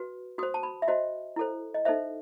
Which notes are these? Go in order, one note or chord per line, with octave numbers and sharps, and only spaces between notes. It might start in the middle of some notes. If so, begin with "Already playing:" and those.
Already playing: F#4 B4
F#4 C5 D#6
A5
B5
E5
F#4 C5 D#5
E4 A4 C5
D#5
D#4 A4 C5 E5